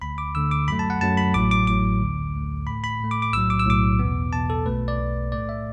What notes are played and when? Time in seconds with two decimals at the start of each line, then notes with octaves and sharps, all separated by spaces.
0.02 D2 D3 A3 B5
0.18 D6
0.35 D2 D3 A3 E6
0.51 D6
0.68 F#2 F#3 A3 B5
0.79 A5
0.90 F#5
1.01 F#2 F#3 A3 A5
1.17 B5
1.34 A1 A2 F#3 D6
1.51 D6
1.67 A1 A2 F#3 D6
2.00 D2 D3 A3
2.34 D2 D3 A3
2.67 A2 A3 B5
2.84 B5
3.00 A2 A3
3.11 D6
3.22 D6
3.33 B1 A2 F#3 E6
3.50 D6
3.59 E6
3.66 B1 A2 F#3 D6
3.99 E2 B2 B3
4.32 E2 B2 B3 A5
4.50 A4
4.66 B1 B2 A3 B4
4.88 D5
4.99 B1 B2 A3
5.32 A2 A3 D5
5.49 E5